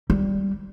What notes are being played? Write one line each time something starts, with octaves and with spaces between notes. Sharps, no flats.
G3